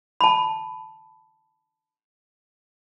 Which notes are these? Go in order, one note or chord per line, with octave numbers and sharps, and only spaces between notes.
A5 B5